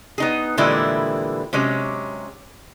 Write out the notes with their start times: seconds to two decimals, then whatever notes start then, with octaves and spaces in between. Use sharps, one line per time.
0.18 B3 D#4 G#4
0.58 A#2 D3 E3 G3 G#3 E4
1.53 C3 F#3 G#3 C#4